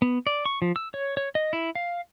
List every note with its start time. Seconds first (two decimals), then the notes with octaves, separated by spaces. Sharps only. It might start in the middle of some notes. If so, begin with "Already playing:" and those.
0.02 B3
0.27 D5
0.46 C#6
0.62 F3
0.76 E6
0.94 C#5
1.17 C#5
1.35 D#5
1.53 E4
1.75 F5